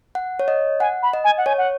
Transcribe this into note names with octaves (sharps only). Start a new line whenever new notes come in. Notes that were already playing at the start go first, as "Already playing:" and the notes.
F#5
C#5
D#5
F#5 G#5
B5
D#5
G#5
F#5
C#5 G#5
F#5